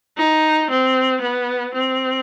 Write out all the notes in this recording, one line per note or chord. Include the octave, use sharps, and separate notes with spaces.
D#4
C4
B3
C4